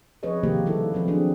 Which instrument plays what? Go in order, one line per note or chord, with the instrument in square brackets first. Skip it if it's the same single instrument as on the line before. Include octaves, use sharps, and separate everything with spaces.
[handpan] F3 C4 G#4 B4 C#5 D#5
C3 D#3 F3 A#3 G4 C5
C#3 G3 A#3 E4 A4 B4
F3 F#3 C4 B4
C4 D4 G#4